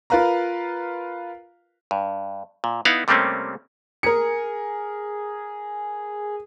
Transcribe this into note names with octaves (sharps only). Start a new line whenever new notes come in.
F4 A#4 B4 F5 A#5
G2
A#2
B3 D#4 E4 F5 F#5
C3 G3 A3 A#3 C4 C#4
G#4 A#4 C#7